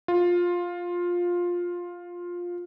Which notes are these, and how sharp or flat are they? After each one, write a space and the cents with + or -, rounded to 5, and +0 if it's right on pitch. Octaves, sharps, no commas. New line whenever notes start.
F4 +10